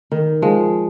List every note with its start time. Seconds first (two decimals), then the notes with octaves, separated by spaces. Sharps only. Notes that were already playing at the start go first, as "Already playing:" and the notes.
0.12 D#3
0.42 F3 G#3